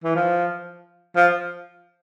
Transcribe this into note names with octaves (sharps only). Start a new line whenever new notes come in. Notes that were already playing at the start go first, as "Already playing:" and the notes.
E3
F3
F3